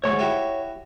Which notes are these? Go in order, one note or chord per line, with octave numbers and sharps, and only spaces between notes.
D2 G#2 C#5 C#6
E4 F#4 G4